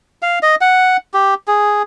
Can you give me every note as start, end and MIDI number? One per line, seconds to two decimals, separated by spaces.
0.22 0.39 77
0.43 0.55 75
0.61 0.97 78
1.14 1.34 67
1.48 1.82 68